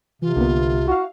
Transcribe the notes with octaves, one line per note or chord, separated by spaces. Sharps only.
C3 E3 F4
C2 D3 A#3 B3
E4 F#4 F5